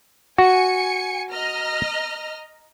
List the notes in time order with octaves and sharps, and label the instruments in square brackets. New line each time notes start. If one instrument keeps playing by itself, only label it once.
[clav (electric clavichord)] F#4 [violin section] G#5 C#7
[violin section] D#5 A#5 F6